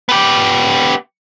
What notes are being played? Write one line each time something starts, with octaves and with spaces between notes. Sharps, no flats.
B3 G4